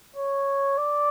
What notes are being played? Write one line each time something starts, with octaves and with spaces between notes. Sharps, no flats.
C#5
D5